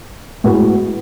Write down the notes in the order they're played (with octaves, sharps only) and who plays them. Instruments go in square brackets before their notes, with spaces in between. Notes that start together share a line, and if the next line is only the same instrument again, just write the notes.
[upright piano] A2 G#3 B3 F#4 B4